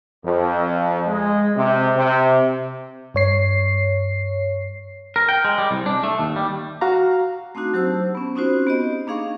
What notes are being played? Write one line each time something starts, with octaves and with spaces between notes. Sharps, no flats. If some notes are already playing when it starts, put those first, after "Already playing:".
F2
G#3
C3
C3
G2 C#5 C7
A#4
G5
G#3
G3
C2
D4
A3
D#2
G3
F#4 F5 A#5
A3 C4 D4 D#4 F#4
F#3 G4 C5 A5 E6
B3 C#4
C4 C#4 D#4 F4 F#4 C5
B3 G4 D#5
A#3 D4 D#4 G#4 F5 C#6